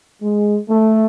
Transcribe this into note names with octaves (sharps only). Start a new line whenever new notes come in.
G#3
A3